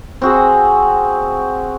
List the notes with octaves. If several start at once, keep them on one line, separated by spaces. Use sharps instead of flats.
C4 F#4 G#4